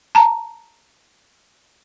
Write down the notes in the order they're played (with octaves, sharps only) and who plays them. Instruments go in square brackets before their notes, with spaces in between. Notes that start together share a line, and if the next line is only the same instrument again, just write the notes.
[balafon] A5 A#5